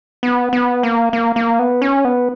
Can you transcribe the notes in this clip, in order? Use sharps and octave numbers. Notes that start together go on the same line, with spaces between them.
B3
B3
A#3
A#3
A#3
B3
C#4
B3